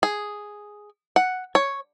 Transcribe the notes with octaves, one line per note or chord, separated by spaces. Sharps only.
G#4
F#5
C#5